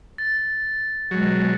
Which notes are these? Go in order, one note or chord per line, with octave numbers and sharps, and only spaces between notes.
A6
B2 F#3 G#3